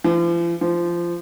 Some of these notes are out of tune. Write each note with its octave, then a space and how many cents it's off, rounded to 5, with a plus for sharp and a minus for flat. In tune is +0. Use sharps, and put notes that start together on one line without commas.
F3 -45
F3 -20